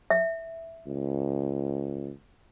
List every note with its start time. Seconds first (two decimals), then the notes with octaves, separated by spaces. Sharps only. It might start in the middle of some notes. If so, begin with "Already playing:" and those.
0.10 E5
0.87 C#2